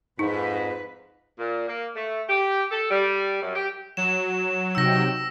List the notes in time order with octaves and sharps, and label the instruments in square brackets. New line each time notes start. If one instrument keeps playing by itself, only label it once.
[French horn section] F2 G#2 [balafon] D#4 [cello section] B4
[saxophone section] A#2
A#3
A3
G4
A4
G3
F#2
G4
[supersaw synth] F#3 [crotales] E7
[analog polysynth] C3 D#4 G5 [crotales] E6 A#6